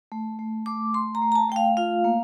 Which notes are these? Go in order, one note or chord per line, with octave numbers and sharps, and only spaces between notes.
A3
A3
A3 D6
A3 C6
A#5
A3
A#5
A5
A3 G5
F5
F4 F5
A#3